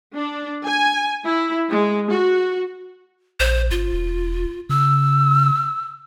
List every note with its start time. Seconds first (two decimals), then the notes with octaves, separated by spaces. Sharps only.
0.15 D4
0.66 G#5
1.26 E4
1.69 G#3
2.11 F#4
3.40 A#1 C5
3.71 G1 F4
3.93 E1
4.69 C#3 E6